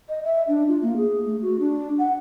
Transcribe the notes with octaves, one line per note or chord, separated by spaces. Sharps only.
D#5
E5
D4
F4
A#3
G#4
A3
F#4
D4
F#5